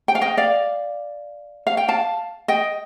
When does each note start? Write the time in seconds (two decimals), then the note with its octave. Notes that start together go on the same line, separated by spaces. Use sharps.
0.08 G5
0.15 F5
0.21 D#5 G5
0.37 D5 F5
1.67 F5
1.77 G5
1.88 F5 A5
2.48 D#5 G5